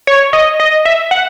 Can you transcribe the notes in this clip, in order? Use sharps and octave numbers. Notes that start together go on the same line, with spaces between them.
C#5
D#5
D#5
E5
F#5